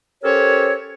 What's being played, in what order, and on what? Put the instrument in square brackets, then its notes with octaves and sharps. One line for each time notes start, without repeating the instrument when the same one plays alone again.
[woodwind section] C#4 G4 A4 A#4 C5 C#5